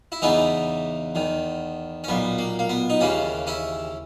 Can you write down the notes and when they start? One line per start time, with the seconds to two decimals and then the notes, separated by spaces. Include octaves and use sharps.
0.12 E4
0.22 E2 C#3 E3 B3 D#4
1.15 E2 D#3
2.04 C#4
2.08 B1 A#2 B3
2.39 A#3
2.59 A#3
2.69 B3
2.90 D#4
3.00 D#2 C#3 E3 A#3 C#4
3.47 C#4 E4